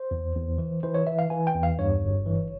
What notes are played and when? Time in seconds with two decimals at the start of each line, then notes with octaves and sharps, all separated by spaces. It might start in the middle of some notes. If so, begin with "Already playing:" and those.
Already playing: C5
0.11 E2
0.36 E2
0.58 E3
0.83 E3 C5
0.94 C#5
1.07 E3 E5
1.19 F5
1.30 E3 G#5
1.47 G5
1.55 E2
1.63 F5
1.79 G2 C#5
2.02 G1
2.26 E3